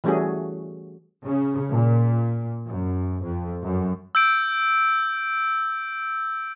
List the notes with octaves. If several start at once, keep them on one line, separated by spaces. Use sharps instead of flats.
E3 G3 A3 C#4 F#4 G#4
C#3
A#2
F#2
F2
F#2
E6 G6 D7